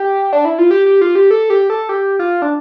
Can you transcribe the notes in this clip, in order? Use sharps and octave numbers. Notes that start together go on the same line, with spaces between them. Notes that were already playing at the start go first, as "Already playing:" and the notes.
Already playing: G4
D4
E4
F4
G4
G4
F4
G4
A4
G4
A4
G4
F4
D4